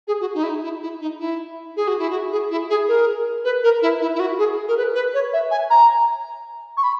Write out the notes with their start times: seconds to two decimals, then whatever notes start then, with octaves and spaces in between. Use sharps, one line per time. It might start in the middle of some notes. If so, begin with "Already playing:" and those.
0.08 G#4
0.21 F#4
0.35 D#4
0.43 E4
0.50 D#4
0.63 E4
0.82 E4
1.01 D#4
1.20 E4
1.77 G#4
1.88 F#4
1.99 E4
2.10 F#4
2.32 G#4
2.51 E4
2.70 G#4
2.88 A#4
3.45 B4
3.64 A#4
3.82 E4
4.01 E4
4.15 E4
4.20 F#4
4.39 G#4
4.68 A#4
4.77 B4
4.95 B4
5.14 C#5
5.33 E5
5.51 G#5
5.70 A#5
6.77 C#6
6.83 B5